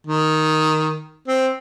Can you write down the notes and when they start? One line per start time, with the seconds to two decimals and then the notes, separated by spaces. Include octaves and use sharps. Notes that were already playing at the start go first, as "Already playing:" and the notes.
0.07 D#3
1.28 C4